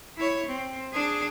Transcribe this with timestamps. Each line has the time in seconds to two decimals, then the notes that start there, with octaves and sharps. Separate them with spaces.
0.17 E4 C#5
0.46 C4
0.93 D4 G#4